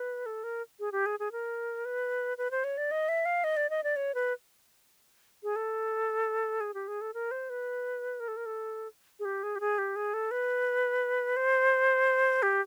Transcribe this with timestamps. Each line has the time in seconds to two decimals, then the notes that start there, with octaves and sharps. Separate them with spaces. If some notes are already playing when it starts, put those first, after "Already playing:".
Already playing: B4
0.26 A4
0.44 A#4
0.80 G#4
0.92 G4
1.06 G#4
1.20 G#4
1.32 A#4
1.85 B4
2.38 B4
2.51 C5
2.64 C#5
2.77 D5
2.91 D#5
3.09 E5
3.25 F5
3.44 D#5
3.57 D5
3.70 D#5
3.84 D5
3.96 C#5
4.15 B4
5.43 G#4
5.56 A4
6.61 G#4
6.74 G4
6.88 G#4
7.01 A4
7.14 A#4
7.31 C5
7.50 B4
8.20 A#4
8.28 A4
8.37 A#4
8.46 A4
9.19 G#4
9.25 G4
9.43 G#4
9.56 G4
9.60 G#4
9.78 G4
9.96 G#4
10.14 A4
10.31 B4
11.37 C5
12.43 G4